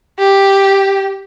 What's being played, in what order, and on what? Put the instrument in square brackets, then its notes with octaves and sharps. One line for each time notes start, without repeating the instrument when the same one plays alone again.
[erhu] G4